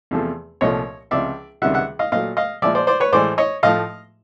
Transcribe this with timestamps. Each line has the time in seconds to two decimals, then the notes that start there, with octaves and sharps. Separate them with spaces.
0.11 E2 C3 F3 A3
0.61 C2 A#2 F3 A3 C#5 D#5
1.11 C#2 C3 F3 D5 E5
1.62 C#2 C3 D#3 G3 E5 F#5
1.74 E5 F#5
1.99 D#5 F5
2.12 A#2 F#3 A3 D#5 F5
2.37 D#5 F5
2.62 A#2 F3 G#3 D5 E5
2.75 C5 D5
2.87 C5 D5
3.00 B4 C#5
3.12 A2 E3 G#3 C5 D5
3.38 C#5 D#5
3.63 A2 F3 A3 D#5 F5